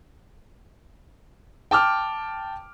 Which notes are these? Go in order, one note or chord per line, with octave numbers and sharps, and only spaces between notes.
G5 A5 D6 F6